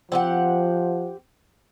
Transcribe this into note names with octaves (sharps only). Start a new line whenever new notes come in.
F3 C4 G4 F#5